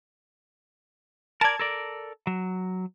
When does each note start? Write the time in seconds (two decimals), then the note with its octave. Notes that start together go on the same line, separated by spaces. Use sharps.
1.41 A#4 D5 A5 G#6
1.60 A4 A#4 D5
2.27 F#3